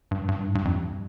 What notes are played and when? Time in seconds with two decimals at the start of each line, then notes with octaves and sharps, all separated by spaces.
0.11 G2
0.28 G2
0.47 G#2
0.55 G2
0.65 F2
0.74 G2